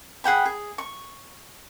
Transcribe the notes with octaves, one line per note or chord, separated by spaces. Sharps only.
G#4 F#5 G5 B5
G#4
C#6